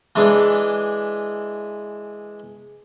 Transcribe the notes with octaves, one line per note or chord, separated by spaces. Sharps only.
E3 G#3 D4